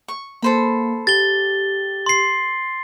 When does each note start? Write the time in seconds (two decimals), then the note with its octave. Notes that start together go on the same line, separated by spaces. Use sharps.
0.08 C#6
0.42 A#3 A4 C5 B5
1.07 G4 A6 G7
2.06 C6 C7